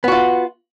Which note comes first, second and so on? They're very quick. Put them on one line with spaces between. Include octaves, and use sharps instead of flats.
B3 F#4 F4